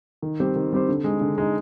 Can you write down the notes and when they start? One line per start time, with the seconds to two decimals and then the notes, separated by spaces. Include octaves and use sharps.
0.22 D#3
0.40 G3 C4 G4 C5
0.56 D#3
0.72 G3 C4 G4 C5
0.89 D3
1.04 G#3 D#4
1.21 D3
1.38 G#3 D#4